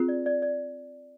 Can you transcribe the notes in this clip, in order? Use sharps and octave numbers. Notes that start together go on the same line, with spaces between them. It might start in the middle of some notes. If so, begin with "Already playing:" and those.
Already playing: C4 F4 G#4
D5
D5
D5